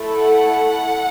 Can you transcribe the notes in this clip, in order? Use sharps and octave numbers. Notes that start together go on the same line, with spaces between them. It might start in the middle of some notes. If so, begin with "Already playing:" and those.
Already playing: A3 E4 A4
F#5